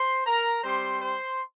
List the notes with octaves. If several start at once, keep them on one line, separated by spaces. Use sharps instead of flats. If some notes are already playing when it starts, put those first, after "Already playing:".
Already playing: C5 C6
A#4 A#5
G3 C4 G4 C5 C6
C5 C6